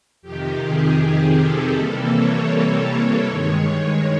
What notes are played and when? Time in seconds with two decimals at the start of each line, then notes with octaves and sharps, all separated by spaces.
0.22 F2 C3 D#3 G4
0.60 G#4
0.97 G#4
1.36 A4
1.73 C3 E3 G3 A#3 A4
2.10 C#5
2.86 C#5
3.22 G2 D#3 G#3